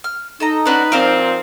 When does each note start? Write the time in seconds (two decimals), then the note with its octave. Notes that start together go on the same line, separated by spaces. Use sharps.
0.04 F6
0.40 D#4 A4 D#5 A#5
0.65 C#4 D4 F#4 B4
0.92 A#2 F3 C4 A#4 C5 F5